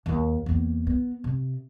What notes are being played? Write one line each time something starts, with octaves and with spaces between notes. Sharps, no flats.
D#2 D#3
E2 A#3
B3
C3